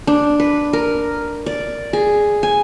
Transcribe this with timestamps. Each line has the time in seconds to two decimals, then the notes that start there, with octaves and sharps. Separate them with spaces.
0.07 D4
0.40 B4
0.73 A#4
1.46 D5
1.93 G#4
2.43 G#5